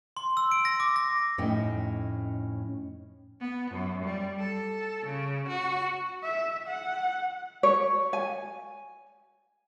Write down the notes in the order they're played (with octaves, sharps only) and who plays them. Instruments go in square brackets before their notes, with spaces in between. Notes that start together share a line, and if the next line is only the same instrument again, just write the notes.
[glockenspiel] C6
E6
D7
A#6
D6
A#6
[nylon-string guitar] F2 A2 C#4 D#4 D#5 G5
[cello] B3
F#2
G3
A4
C#3
F#4
[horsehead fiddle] E5
F#5
[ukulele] C#5
G#5